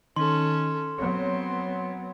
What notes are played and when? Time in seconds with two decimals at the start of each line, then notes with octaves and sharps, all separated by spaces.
0.16 D#3 C#4 A4 C6
0.98 F#3 B3 C4 C#5